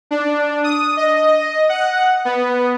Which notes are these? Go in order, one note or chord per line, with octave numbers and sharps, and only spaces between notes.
D4
D#6
D#5
F#5
B3